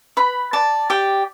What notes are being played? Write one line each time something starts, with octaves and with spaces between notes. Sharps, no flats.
B4 B5
D5 A5
G4 G5